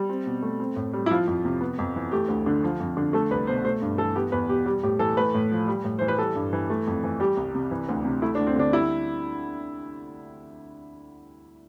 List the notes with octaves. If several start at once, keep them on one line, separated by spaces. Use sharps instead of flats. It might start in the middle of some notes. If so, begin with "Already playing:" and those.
Already playing: G3
C4
B2
A3
C4
A2
G3
E4
F3 F4
F2
C3
B3
F2
E3
A3 G4
D2
D3
F3
F2
D3
A3 A4
C2 B4
B2 C5
A3 C5
G2
E3 A4
B3 G4
E2 B4
B2 G4
G3 G4
A2 G4
E3 A4
A3 B4
A2
F3
G3
A2
E3 C5
B4
G3 A4
G2
E3
A3
F2
E3
G3 G4
C2
C3
E3
D2
C3
A3 E4
D4
D2
C4
D3 D4
G3 E4